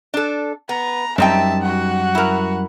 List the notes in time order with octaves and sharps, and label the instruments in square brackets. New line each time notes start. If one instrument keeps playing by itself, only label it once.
[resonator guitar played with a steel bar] D4 A4
[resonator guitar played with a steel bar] B3 [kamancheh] A#5
[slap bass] F#2 G3 [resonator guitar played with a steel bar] C4 D#4 G5 [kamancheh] E5 A5
[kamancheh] F#4 F#5
[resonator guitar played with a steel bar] E4 A#4